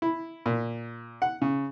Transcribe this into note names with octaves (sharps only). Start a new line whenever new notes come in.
E4
A#2
F#5
C#3